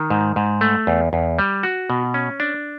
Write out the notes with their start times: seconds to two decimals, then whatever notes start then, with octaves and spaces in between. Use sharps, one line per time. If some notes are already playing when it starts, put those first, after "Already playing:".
Already playing: D#3
0.10 G#2
0.36 G#2
0.61 A3
0.87 E2
1.13 E2
1.39 G3
1.63 F#4
1.90 B2
2.14 C#4
2.40 D4